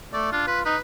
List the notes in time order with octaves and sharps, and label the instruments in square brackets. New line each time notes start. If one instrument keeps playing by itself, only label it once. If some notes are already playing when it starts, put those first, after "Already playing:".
[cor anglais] A3 [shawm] D5
[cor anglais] D4 [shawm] F4
[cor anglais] F4 [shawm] B4
[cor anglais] D#4 [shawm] B4